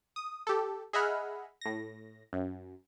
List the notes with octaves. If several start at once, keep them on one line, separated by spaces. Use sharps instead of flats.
D#6
G4 A4
G#4 D#5 E5 F#5 B5 F6
A2 A#6
F#2